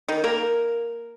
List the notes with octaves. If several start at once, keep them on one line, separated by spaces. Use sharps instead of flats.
D#3 D#4
A#3 A#4